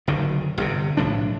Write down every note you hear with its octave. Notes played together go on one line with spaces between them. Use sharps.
F#1 D3 D#3
G1 G2 C3
B1 A2 F3 D4